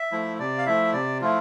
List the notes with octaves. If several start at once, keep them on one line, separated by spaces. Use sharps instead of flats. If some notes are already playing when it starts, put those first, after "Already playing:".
Already playing: E5
F3 A3 E4
C3 D5
F5
F3 A3 E4 E5
C3 D5
F3 A3 E4 F4